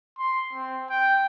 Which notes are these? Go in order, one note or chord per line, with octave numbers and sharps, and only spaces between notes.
C6
C4
G5